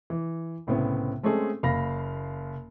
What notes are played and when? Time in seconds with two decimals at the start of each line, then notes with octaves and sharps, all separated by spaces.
0.10 E3
0.67 C2 A2 C#3 B3 C4
1.23 G#3 A3 C4 C#4 G#4 A4
1.63 F#1 F5 B5 A#6